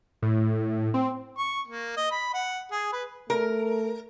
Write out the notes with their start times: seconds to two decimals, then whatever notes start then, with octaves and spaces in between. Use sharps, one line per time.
0.22 A2
0.94 C4
1.38 C#6
1.68 A#3
1.97 D#5
2.11 B5
2.34 F#5
2.71 G#4
2.93 B4
3.30 A3 A#4